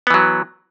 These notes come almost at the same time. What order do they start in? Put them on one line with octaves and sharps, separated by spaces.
B3 E3 F#3